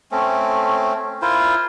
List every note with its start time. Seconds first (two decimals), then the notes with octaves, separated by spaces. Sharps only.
0.12 A3 C4 C#4
1.22 E4 F4 A#4 C5